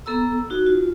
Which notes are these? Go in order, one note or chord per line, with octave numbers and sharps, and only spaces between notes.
B3 A4 A#5 E6
D#4 F#4
F4